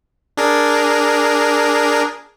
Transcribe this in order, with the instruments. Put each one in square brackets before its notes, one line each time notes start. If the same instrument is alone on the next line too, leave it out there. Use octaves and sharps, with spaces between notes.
[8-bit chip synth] D4 G#4 A#4